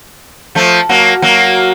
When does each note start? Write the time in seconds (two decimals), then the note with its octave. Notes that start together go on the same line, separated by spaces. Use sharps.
0.55 F3 A3
0.89 F#3 A#3
1.22 F#3 A#3